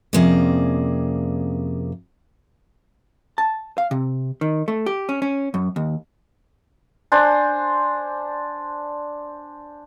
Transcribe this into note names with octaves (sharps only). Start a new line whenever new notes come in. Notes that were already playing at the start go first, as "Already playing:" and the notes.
F2 C3 A#3 C#4 G#4 D5
A5
F5
C3
D#3
A3
G4
C#4
C#4
F#2
D#2
D4 C5 G#5